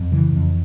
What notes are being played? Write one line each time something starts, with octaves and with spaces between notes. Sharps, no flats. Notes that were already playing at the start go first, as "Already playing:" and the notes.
Already playing: F2
C#3 E3
F2